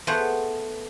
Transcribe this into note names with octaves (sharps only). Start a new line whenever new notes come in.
A3 B3 G#4 C5 F#5